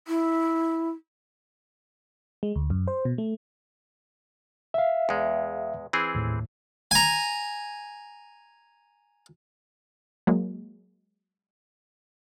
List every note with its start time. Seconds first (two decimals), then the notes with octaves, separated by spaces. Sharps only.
0.07 E4
2.43 G#3
2.56 D2
2.70 F#2
2.88 C5
3.05 B2
3.18 A3
4.74 E5 F5
5.09 E2 G#3
5.93 E3 C4 G#4
6.15 D#2 A2
6.91 G#5 A#5
10.27 F#3 G#3 A#3